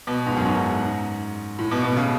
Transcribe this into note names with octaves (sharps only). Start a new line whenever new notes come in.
B2
G#2
F#2
G#2
A2
B2
B2
C#3